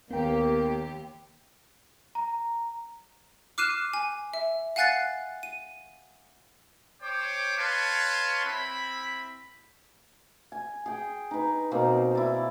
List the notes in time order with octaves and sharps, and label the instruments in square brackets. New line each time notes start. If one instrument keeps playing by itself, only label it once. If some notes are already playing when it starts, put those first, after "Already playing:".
[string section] D#2 G4 [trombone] A#3 [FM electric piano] B3 G5
[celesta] A#5
[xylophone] D6 F6 F#6 C7 D#7 E7
G#5
E5
F5 F#5 G#5 F#6 A6 C7
D#7
[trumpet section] C5 C#5 G5 D6
B4 C#5 F5 A5 C6 C#6
C4 E4 E5 B5
[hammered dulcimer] G#5
G#4 G5
D#4 B4
B2 A#3 C4
E4 D5